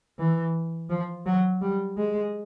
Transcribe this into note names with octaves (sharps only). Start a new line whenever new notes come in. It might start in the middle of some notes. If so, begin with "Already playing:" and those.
E3
F3
F#3
G3
G#3